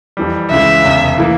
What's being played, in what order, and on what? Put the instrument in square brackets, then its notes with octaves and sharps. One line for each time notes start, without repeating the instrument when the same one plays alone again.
[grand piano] F2 E3 G3
[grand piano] C#2 C#3 E3 G#3 [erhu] E5
[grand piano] F1 E2 C#3
E3 A#3 E4